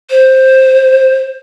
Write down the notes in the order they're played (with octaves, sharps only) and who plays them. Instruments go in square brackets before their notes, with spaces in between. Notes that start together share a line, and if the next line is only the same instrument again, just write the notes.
[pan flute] C5